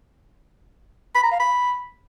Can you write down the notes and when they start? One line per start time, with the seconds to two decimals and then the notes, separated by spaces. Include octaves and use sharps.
1.15 B5
1.23 A#5
1.32 F5
1.40 B5